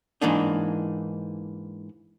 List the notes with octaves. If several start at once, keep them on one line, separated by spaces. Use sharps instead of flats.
G#2 E3 A#3 D4 D#4